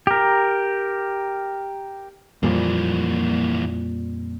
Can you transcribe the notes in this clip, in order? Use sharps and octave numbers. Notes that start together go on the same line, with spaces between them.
G4 A#4
F2 A#2 E3 F3 G3 A#3